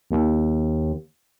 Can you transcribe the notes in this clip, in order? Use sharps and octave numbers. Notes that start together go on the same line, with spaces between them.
D#2